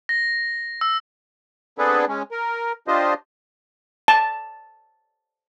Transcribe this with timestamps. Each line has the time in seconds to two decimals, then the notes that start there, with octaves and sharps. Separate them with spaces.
0.09 A#6
0.81 E6
1.78 B3 C4 D4 G#4 A4 B4
2.08 G#3 C#4
2.31 A#4
2.88 D4 F4 G4 C5 D#5
4.08 A5